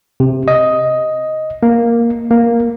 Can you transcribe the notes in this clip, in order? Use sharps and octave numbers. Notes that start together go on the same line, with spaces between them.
C3
D#5
A#3
A#3